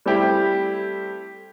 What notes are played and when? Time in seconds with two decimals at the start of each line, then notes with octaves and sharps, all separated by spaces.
0.06 G3 A3 C4 E4 G4